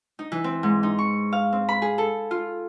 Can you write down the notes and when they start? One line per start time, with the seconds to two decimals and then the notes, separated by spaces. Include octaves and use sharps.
0.19 D#4
0.32 E3
0.44 C4
0.63 G#2
0.83 D#4
0.98 C#6
1.33 F5
1.53 C4
1.69 B5
1.82 G#4
1.98 A4
2.31 F4